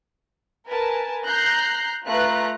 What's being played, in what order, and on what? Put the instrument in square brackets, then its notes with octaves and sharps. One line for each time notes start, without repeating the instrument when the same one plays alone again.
[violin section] A#4 B4 G#5 A5
A#5 F#6 G6 A#6 C7
A3 F4 B4 A#5 F#6